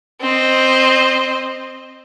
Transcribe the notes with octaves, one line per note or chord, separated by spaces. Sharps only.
C4 D#5